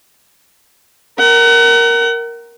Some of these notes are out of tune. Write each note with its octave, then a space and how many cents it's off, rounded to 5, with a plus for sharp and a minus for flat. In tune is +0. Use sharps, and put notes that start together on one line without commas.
A#4 +0 F#5 +35